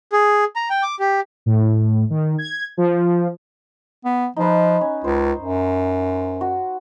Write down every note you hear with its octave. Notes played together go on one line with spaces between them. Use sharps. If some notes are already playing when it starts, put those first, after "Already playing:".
G#4
A#5
G5
D6
G4
A2
D#3
G#6
F3
B3
F3 D#4 B4
C#4
C#2 C5
F#2
F#4